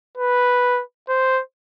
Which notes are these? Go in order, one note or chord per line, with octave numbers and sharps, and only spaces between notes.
B4
C5